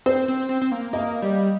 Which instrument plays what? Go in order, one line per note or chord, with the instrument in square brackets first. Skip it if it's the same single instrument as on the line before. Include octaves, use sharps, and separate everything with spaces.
[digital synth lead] C4 [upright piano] C5
[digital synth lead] C4
C4
C4
A#3
[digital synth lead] A#3 [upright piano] D#5
[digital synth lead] G3